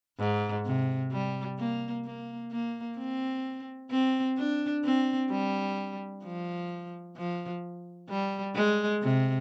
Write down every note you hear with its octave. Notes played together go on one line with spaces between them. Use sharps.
G#2
C3
G3
A#3
A#3
A#3
C4
C4
D4
C4
G3
F3
F3
G3
G#3
C3